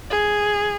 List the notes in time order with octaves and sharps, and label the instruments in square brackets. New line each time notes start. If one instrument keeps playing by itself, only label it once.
[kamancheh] G#4